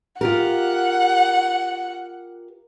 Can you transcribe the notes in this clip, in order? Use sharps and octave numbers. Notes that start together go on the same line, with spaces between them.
F4 G4 A#4 F#5